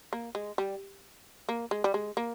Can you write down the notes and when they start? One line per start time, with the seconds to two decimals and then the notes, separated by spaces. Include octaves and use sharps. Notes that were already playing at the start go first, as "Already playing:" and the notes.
0.13 A#3
0.35 G#3
0.58 G3
1.49 A#3
1.71 G#3
1.84 G3
1.94 G#3
2.17 A#3